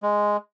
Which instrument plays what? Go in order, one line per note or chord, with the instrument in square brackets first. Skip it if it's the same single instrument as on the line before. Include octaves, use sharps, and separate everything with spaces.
[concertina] G#3